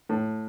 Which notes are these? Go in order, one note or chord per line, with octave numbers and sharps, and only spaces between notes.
A2